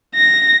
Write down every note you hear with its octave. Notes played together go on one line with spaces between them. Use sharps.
A#6